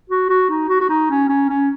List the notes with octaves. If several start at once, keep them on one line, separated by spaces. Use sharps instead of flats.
F#4
F#4
D#4
F#4
F#4
D#4
C#4
C#4
C#4